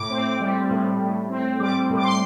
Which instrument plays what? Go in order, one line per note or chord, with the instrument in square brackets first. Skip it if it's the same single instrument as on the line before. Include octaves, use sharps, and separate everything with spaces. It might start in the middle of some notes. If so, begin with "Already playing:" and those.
Already playing: [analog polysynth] A2 D6
C4
G3
A2
A2
C4
G3 D6
A2
D6
C6